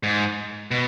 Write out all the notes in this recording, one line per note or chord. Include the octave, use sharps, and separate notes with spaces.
G#2
B2